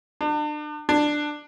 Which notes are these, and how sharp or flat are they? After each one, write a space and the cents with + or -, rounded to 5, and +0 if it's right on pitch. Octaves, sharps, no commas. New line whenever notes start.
D4 +35
D4 +10